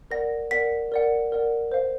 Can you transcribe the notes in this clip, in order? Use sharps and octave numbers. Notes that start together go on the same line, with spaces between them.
A#4 D5 F#5 A#6
A#4 D5 F#5 B6
A#4 D5 F#5
A#4 D5 F#5
C5 F5